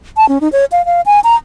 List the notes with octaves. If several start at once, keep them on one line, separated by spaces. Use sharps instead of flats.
A5
C#4
D#4
C#5
F5
F5
G#5
A#5